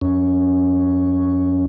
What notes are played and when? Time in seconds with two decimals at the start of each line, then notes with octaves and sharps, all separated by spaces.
0.01 F2 C#4